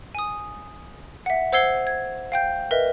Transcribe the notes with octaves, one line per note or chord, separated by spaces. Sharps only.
G#5 D#6
E5 F#5
C5 F#5 E6 G#6 C7 G7
G#6
F5 G5 G6
A#4 B4 D#5 E5